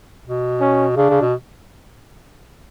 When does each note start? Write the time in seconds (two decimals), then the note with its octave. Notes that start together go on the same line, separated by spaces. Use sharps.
0.24 B2
0.60 C#4
0.97 C#3 D4
1.10 C#3
1.21 B2